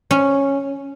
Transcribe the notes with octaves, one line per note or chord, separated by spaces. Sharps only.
C#4